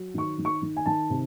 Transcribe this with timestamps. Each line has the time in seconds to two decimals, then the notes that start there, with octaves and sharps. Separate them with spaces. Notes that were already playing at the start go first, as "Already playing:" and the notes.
Already playing: F#3
0.14 D#3 C#6
0.38 D#3
0.45 C#6
0.62 D#3
0.76 G#5
0.86 D#3 A5
1.10 C3